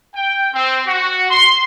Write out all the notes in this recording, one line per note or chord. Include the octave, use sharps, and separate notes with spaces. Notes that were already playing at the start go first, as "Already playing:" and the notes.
G5
C4
F#4
C6